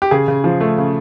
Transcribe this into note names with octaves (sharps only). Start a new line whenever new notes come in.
G4
C#3 G#4
C#3
F3
A3
C#3